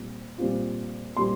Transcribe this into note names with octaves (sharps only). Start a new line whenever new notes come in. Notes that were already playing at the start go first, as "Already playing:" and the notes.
Already playing: A#2 G3 C4
A#2 G3 C4 F4
A#2 G3 C4 C6